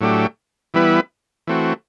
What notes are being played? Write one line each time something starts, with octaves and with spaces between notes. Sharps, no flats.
A2 F#3 A3 D4 G4
E3 G3 B3 E4 B4
E3 A3 C4 F#4